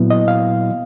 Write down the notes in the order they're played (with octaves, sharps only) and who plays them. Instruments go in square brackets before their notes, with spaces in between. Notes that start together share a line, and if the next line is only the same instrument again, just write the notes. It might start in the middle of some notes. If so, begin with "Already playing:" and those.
Already playing: [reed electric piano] A#2 F#3 B3 E4
D#5
F5